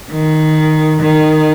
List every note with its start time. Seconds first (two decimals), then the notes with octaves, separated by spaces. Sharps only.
0.12 D#3
1.01 D#3